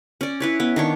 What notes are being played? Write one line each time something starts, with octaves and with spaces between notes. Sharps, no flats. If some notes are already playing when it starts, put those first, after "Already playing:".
C#4 D5
E4 B4 C#5
B3
D#3 D4 C#5